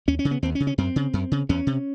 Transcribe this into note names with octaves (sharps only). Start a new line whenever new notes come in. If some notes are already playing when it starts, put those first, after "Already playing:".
D#2 C#4
C#4
C#3
B3
D#2 C4
C#4
C#3
C#4
F#2 C4
C#3
F#2
C#3
E2 C#4
C3